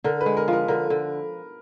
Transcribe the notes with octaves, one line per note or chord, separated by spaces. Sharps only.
D3 A#4
B4
G#3
A#4
F3 A#4
D3 A#4
D3